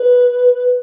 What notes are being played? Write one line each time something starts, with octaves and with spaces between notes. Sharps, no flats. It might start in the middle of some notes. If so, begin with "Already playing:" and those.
Already playing: B4